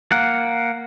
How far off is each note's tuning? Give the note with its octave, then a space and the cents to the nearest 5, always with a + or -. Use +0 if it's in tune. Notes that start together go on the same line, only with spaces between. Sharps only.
A#3 +0 F#5 +0